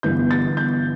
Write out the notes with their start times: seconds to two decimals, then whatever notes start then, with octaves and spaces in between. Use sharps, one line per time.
0.03 G1 G2 E3 B3 G6
0.31 A6
0.57 G6